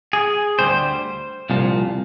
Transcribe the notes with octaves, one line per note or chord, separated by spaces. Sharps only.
G#4
D2 C3 G3 C5
C2 A#2 F3